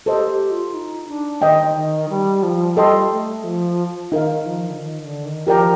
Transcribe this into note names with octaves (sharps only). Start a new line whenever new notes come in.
G4 A4 C5 D#5
G4
F4
D#4
D4
D#3 C5 D#5 G5
D#3
G3
F3
G3 A4 D#5 G5 C6
A3
F3
D#3 D#4 A#4 F5
F3
D3
D#3
D3
D#3
F3 G4 A#4 D5 G5 A#5